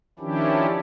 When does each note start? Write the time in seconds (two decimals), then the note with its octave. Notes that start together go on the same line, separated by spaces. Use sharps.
0.19 D#3 F3 C#4 D4 E4 G4